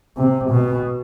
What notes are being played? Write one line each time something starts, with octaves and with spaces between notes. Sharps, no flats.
C3
B2